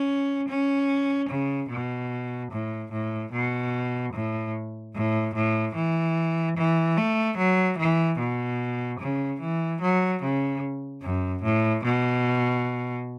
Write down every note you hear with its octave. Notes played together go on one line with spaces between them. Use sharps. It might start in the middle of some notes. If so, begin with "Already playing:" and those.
Already playing: C#4
C#4
C#3
B2
A2
A2
B2
A2
A2
A2
E3
E3
A3
F#3
E3
B2
C#3
E3
F#3
C#3
F#2
A2
B2